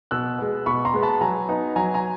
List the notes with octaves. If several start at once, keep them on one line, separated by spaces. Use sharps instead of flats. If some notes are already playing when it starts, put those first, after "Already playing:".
B2 E6 F#6
G#3 B3
B2 B5 C#6
A#5 C6
G#3 B3
A5 B5
F#3 G#5 A#5
B3 D#4
F#3 G#5 A#5
G#5 A#5